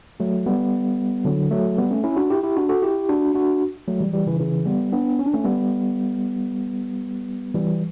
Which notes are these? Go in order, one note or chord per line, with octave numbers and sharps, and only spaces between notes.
F#3 A3
G3 B3
D3 F#3
F#3 A3
G3 B3
A3 C#4
C#4 E4
D4 F#4
E4 G4
E4 G4
D4 F#4
F#4 A4
E4 G4
D4 F#4
D4 F#4
F#3 A3
E3 G3
E3 G3
C#3 E3
C#3 E3
G3 B3
B3 D4
C#4
D4
A3 C#4
G3 B3
E3 G3